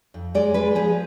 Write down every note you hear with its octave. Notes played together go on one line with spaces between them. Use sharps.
F2
G#3 D5
G#3 B4
F3 G#4